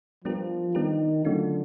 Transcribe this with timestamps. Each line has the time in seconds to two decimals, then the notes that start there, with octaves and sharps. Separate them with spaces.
0.24 F3 G3 B3 D4 G4 A#4
0.75 D#3 G3 B3 D4 G4 A#4
1.25 D3 F#3 A3 C#4 F4